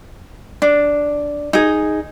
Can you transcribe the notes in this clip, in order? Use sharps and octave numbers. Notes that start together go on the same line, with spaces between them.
D4
D#4 G#4